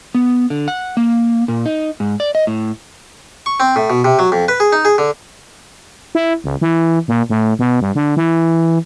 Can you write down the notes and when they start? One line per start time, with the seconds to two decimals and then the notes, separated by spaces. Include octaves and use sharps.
0.15 B3
0.50 D3
0.68 F#5
0.97 A#3
1.48 A#2
1.65 D#4
2.00 G#2
2.20 D5
2.35 D#5
2.47 A2
3.46 C#6
3.60 C4
3.76 A2
3.90 B2
4.05 C3
4.19 F#3
4.32 F2
4.48 B4
4.60 G#4
4.73 D#4
4.85 G#4
4.98 D3
6.15 E4
6.44 C#2
6.61 E3
7.08 A#2
7.30 A2
7.59 B2
7.81 G2
7.95 D3
8.17 E3